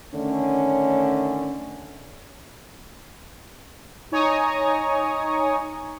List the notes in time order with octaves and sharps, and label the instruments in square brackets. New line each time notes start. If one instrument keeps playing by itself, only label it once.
[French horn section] D3 D#3 A3 C#4
[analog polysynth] D#4 C#5 G#5 A#5 C#6 D#6